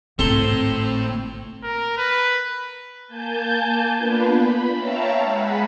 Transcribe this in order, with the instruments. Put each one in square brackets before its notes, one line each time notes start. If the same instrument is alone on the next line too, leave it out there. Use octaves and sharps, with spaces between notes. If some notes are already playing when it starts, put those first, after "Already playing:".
[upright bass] D1 G#1 [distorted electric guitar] A2 [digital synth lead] C4 [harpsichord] A4 A#5 C6
[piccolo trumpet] A#4
B4
[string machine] A#3 G#5 A5 G6
A#3 B3 D4 F4 B4
B5
C#5 E5 F5 G5 A5 A#5
G#3 G#4 F#5 B5